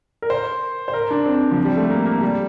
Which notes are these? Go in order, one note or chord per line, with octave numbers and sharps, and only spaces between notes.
A#4
C5
C5
A#4
D4
C4
F3
G3
A3
A#3
A#3
G3